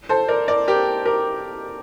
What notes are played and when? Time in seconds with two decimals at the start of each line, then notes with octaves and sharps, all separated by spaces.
0.09 A4 C5
0.28 A#4 D5
0.48 A#4 D5
0.68 G4 A#4
1.05 G4 A#4